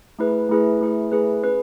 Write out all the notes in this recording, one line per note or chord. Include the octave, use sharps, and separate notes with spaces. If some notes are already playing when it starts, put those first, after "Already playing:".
A3 E4 G#4 B4
A3 E4 G#4 B4
A3 E4 G#4 B4
A3 E4 G#4 B4
C#4 G#4 B4